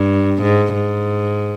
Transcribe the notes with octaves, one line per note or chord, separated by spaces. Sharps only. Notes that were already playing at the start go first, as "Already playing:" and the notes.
Already playing: G2
G#2
G#2